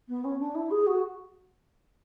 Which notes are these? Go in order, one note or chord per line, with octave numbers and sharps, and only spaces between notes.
B3
C#4
D4
E4
G#4
F#4